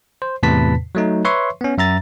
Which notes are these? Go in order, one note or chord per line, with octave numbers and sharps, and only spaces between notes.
C5
E2 A2 C3 B4 A5 B6
F#3 A3 D#4
B4 C#5 E5 C6 C#6
B3 C#4
F#2 E5 A#5 A6